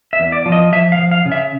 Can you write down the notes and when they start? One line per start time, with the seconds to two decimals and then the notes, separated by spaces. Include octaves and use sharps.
0.13 E5
0.20 E2
0.32 D5
0.46 F3
0.52 D#5
0.72 F3 E5
0.92 F5
0.99 F3
1.11 F5
1.26 C#3
1.32 E5